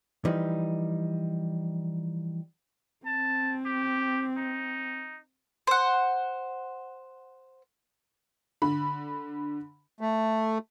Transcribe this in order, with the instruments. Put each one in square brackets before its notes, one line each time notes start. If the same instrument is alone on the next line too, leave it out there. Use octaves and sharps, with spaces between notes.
[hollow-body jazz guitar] E3 F3 G3 D#4
[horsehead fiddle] C4 [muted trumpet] A5
[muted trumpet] G4
D#4
[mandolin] C5 F#5
[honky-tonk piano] D3 B5
[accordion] A3